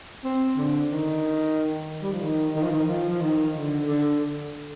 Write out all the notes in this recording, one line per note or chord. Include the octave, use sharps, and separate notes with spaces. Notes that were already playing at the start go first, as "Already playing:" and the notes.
C4
D3
D#3
G3
F3
D#3
D#3
F3
D#3
F3
F3
D#3
D3
D3